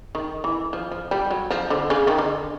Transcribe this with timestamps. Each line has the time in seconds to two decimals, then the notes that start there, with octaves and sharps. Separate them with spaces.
0.15 D#3
0.44 E3
0.73 F3
0.91 F3
1.11 G3
1.30 F#3
1.50 F3
1.70 D3
1.90 C#3
2.07 D#3
2.18 D3